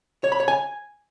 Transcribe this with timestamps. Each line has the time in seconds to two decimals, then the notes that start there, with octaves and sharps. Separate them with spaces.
0.24 C#5
0.32 B5
0.40 C#5
0.48 G#5